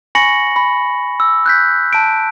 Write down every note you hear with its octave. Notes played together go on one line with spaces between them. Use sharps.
G#5 B5 C#6 A#6 C#7 F#7
B5
E6
F#6 G6 B6
A5 D7